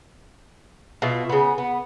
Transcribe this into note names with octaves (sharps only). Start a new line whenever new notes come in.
B2 F4 E5
C#3 B3
B3